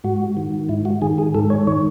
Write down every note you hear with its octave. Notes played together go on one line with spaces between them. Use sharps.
G#2 F#4
D#3
G#2 E4
F#4
D#3 G#4
G#4
G#2 A4
C#5
D#3 C#5